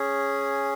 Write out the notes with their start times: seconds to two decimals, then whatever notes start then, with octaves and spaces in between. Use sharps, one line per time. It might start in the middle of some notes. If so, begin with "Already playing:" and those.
Already playing: C#4 G#4